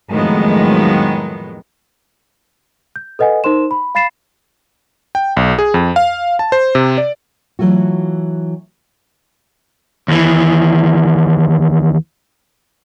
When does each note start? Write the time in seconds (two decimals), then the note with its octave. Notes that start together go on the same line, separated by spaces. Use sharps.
0.11 F2 A2 D#3 F#3 G#3 B3
2.96 G6
3.19 A4 B4 D#5 F#5 G#5
3.44 D#4 A#4 C5 C6 E7
3.71 B5
3.95 F5 B5 A6 C7 E7
5.15 G5
5.37 B1
5.59 G#4
5.74 F2
5.96 F5
6.39 A5
6.52 C5
6.75 C3
6.98 D5
7.59 E3 F#3 A3 F4 F#4
10.08 D#2 E3